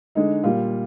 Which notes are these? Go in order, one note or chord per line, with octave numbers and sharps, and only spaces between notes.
D3 G#3 D#4
A#2 G3 A#3 F4